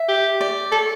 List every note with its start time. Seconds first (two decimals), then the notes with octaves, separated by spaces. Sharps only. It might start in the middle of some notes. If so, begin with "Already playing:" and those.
Already playing: E5
0.09 G4
0.41 D5
0.72 A4 C#5